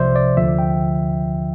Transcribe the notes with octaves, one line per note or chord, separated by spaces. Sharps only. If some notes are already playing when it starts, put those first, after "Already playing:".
Already playing: C2 C3 F3 C5 D5 E5
D5
D2 D3 F3 E5
G5